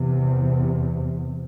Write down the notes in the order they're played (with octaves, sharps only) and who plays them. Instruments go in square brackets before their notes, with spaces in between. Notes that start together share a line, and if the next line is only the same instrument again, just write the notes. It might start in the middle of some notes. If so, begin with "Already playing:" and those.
Already playing: [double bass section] E2 C3